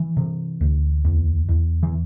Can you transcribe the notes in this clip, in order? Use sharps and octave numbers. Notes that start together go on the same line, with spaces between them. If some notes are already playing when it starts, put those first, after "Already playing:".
Already playing: E3
C3
D2
E2
E2
E3